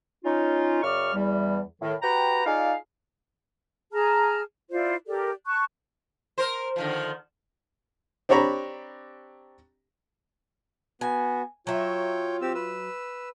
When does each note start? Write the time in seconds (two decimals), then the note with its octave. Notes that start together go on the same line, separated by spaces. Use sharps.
0.24 C#4 D#4 F4
0.83 F#2 C#3 D5 C#6 F6
1.14 E2 G3
1.81 A2 D#3
2.02 F#4 G4 B4 G5 A#5
2.45 D#4 F4 G#4 D5 F5
3.92 G#4 A5 A#5 F6
4.71 E4 F4 C5 D5
5.07 G4 A4 A#4 D5
5.46 A5 C#6 F#6
6.38 A#4 C5
6.76 D3 D#3 F3
8.29 C4 D4 G4 C#5 A#5 B5
11.01 B3 F#4 G#5
11.67 F#3 F4 C#5 E5 G5
12.42 C4 G4 E6
12.55 B4 E6